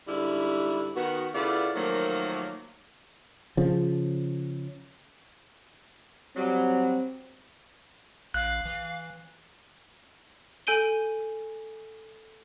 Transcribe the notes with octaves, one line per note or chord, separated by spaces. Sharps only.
G#2 D3 G3 E4
D#3 B3 F#4
C#3 B3 E4 F4 A4 D5
D#3 F3 F#3 A3 A#3
C#3 F3
F#3 G3 C4
A#1 F5 F#6
E3
A4 G#5 G6 D7 D#7 G7